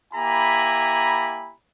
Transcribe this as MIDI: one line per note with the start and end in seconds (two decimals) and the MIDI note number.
0.14 1.52 58
0.14 1.52 64
0.14 1.52 67
0.14 1.52 80
0.14 1.52 82
0.14 1.52 83